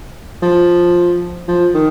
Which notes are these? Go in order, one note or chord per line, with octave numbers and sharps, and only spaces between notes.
F3
F3
D#3